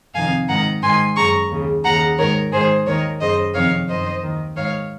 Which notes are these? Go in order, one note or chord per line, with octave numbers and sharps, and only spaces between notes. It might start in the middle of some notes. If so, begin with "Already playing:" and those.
F2 C3 D#3 F5 G#5
G#2 D#3 F#5 A#5
G#2 D#3 G#5 C6
F#2 C#3 A#5 C#6
D#2 C#3
D#2 C#3 F#5 A#5
G#2 D#3 A#4 C#5
G#2 D#3 G#4 C5
D#2 D#3 A#4 C#5
F#2 C#3 C5 D#5
F2 C3 D#3 C#5 F5
F#2 D#3 C5 D#5
D#2 D#3
G#2 D#3 C#5 F5